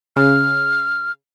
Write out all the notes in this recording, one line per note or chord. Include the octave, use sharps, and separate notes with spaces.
C#3 F6